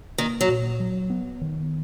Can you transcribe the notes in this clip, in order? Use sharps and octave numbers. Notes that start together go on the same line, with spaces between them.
D#3 A#3
F#3
A#2
F#3
B3
D#3